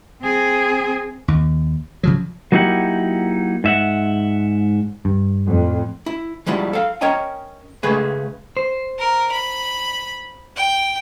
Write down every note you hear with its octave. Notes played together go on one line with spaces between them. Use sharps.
C4 G#4
D#2
C#3 F3 F#3
F#3 A#3 D#4 E4 G4 F#5
G#2 E5 F#5
G2
F2 A2
E4
F3 G3 G#3 E4
A4 F5
C#4 A#4 C#5 D#5 G5 A#5
C#3 G#3 A3 G#4 B4
C5
A#4
B5
G5